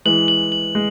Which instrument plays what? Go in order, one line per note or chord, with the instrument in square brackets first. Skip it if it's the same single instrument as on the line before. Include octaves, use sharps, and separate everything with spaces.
[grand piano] E3 G#3 [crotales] F#7
[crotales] F#7
F#7
[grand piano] G#3